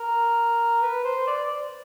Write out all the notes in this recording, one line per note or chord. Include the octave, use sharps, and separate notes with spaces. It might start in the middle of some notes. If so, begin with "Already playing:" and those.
Already playing: A#4
B4
C5
D5